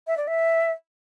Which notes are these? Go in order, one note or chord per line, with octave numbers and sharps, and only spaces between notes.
E5
D5
E5